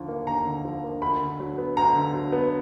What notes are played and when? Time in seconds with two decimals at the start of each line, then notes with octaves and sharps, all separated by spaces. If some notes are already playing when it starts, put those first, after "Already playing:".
Already playing: D#2 D3 F3
0.08 A#3
0.27 D#2 A#5
0.45 D3
0.65 F3
0.84 A#3
1.02 D2 B5
1.21 D3
1.40 F#3
1.58 B3
1.77 D2 A#5
1.95 D3
2.14 F#3
2.32 B3